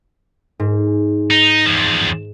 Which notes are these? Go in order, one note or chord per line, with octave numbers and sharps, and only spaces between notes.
G#2
D#4
E2 F3